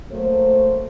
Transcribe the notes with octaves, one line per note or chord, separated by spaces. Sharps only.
F#3 A3 A#3 C5